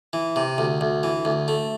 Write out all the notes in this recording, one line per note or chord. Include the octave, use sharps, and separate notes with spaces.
E3
C3
D2
D2
E3
D2
A3